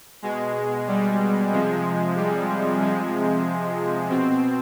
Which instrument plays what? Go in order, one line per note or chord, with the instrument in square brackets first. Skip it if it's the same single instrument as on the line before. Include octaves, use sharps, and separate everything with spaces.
[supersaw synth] B2 G#3
G3
C3 F3 G#3
G3
C3 F3 G#3
B2 C4